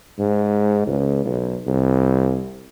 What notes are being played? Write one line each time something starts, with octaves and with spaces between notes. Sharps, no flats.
G#2
C#2
B1
C2